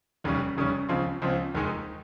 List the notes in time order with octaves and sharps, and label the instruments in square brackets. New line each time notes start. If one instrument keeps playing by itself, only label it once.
[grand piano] F1 D#2 C#3 G3 C#4
F1 D#2 C#3 G3 C#4
C#2 C#3 F3 C4 F4
C#2 C#3 F3 C4 F4
F1 D#2 D#3 G#3 D#4